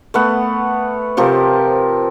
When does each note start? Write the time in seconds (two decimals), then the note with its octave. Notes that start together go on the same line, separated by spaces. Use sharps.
0.14 A3 B3 F#5
1.17 C3 F3 G4 A#4